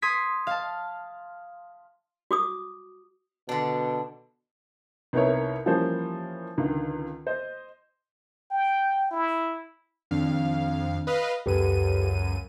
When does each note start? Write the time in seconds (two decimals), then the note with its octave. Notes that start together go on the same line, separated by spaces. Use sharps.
0.02 C6 D#6 G#6 B6
0.47 F5 A5
2.31 F#4 D6 D#6
3.49 B2 D3 D4
5.13 C2 B3 D#4 E4 A#4 C#5
5.66 E3 F3 G3 A#3 C#4 C5
6.57 C#2 D3 D#3
7.27 C5 D#5
8.51 G5
9.11 E4
10.11 F2 D#3 C4 D4 F5
11.07 B4 D#5 F5
11.46 C#2 F#2 G4 A4 B4 D#7